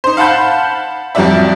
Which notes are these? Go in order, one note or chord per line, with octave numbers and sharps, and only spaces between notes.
D#4 C5
F5 F#5 A5 B5 G6
F2 F3 G3 F#4 D5 E5